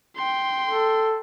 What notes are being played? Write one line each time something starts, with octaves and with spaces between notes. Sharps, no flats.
G5 C6
A4